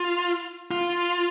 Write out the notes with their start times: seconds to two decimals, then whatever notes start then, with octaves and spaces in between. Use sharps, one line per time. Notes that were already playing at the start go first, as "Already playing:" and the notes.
Already playing: F4
0.71 F4